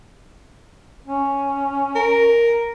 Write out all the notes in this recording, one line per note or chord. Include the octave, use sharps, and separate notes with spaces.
C#4
A#4